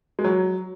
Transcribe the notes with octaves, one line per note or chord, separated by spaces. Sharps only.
G#3
F#3